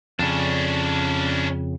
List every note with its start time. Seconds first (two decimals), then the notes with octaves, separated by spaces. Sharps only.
0.19 F2 C#3 C#4 D4